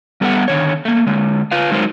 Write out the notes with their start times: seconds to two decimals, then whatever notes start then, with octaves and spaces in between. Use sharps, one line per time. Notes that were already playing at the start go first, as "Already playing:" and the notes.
0.21 G3 B3 A4 C#5 E5 F#5
0.48 D3 D#3 C#5
0.85 A3 A#3
1.07 D3 G#3
1.52 F4 B4 F5
1.71 F#3 G#3 D#4 A#4 C5